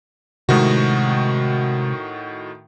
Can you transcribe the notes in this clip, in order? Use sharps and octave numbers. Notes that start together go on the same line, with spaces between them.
A2 C3 D#3 G#3 F#4